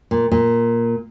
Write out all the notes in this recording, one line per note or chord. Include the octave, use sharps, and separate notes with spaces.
A#2
A#2